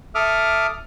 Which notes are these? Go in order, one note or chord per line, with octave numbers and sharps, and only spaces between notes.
A4 E5 D6 D#6 F6